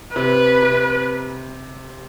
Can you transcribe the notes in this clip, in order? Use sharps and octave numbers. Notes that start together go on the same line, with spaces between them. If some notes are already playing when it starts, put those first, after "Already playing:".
C3 B4
C3